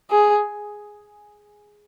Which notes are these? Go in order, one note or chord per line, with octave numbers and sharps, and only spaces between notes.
G#4